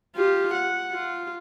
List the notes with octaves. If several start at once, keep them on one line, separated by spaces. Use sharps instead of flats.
F4 G4
F#5
F4